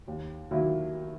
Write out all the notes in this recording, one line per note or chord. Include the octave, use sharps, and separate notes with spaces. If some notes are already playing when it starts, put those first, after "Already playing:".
D#2
D#3 F#3 A#3 E4